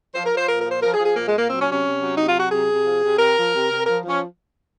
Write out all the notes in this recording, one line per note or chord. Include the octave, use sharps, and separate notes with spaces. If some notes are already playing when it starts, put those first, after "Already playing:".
F3 C5
A#4
F3
C5
A#2 A#4
A#4
F3
C5
F3 A#4
G#4
F3
G#4
A#2 A#3
G#3
A#2
A#3
F#3 C4
C#4
C3
C#4
C3
F#3
C3 D#4
F4
F#3
F#4
C3 G#4
C3
F3
C3
C3 A#4
F3
C3
C3
F3 A#4
F3
C#4